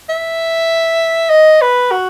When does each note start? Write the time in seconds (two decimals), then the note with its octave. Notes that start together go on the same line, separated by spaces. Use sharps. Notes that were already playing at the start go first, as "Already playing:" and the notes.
0.09 E5
1.30 D#5
1.62 B4
1.91 F#4